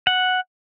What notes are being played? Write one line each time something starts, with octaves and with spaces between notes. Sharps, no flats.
F#5